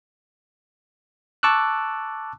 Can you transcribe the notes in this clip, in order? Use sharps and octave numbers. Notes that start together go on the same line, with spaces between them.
A5 C#6 D6 E6 F#6